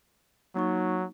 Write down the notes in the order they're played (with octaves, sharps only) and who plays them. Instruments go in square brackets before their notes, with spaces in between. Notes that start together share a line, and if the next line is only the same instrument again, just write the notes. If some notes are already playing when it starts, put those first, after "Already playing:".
[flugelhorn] F#3 [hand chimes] A#3 D#4 C#6